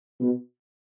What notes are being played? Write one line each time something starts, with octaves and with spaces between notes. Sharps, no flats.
B2